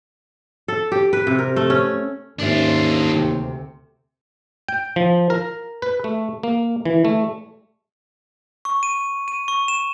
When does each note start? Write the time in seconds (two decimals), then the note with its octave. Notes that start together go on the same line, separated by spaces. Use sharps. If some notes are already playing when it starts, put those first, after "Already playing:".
0.68 A4
0.92 G4
1.13 B4
1.27 C3
1.39 A#4
1.56 A3
1.70 C#4
2.39 D#2 G#2 C#4 D4 F4 E5
3.13 D2 C3
4.68 G5
4.96 F3
5.30 A#4
5.82 B4
6.04 A3
6.43 A#3
6.85 E3
7.05 A3
8.65 C#6
8.83 D#7
9.28 D#7
9.48 C#6
9.68 E7